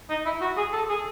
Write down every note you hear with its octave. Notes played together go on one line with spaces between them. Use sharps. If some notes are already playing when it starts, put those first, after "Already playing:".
D#4
E4
F#4
G#4
A4
G#4